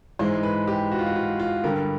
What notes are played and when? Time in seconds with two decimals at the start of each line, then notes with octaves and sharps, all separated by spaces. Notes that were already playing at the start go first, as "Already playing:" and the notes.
0.19 G#2 E3 G#3 C5
0.43 B4
0.67 G4
0.92 F#4
0.99 F4
1.06 F#4
1.16 F4
1.39 F4
1.64 G2 D3 G3 A#4